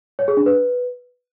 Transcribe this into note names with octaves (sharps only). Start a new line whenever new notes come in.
C#5
G#4
D4
B4